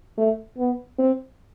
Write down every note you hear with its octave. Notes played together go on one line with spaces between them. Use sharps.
A3
B3
C4